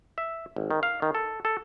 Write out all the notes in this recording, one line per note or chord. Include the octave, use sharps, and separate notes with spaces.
E5
G#1
D#3
F5
D#3
A4
A4